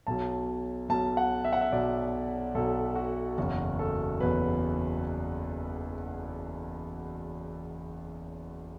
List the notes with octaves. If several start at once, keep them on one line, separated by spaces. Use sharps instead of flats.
B1 B2 F#3 A5
B1 B2 F#3 A5
F#5
E5
F#5
E5
B1 B2 F#3 D5
B1 B2 F#3 A4
F#4
F#1 E2 B2 F#3 F#4
A4
F#1 E2 B2 F#3 B4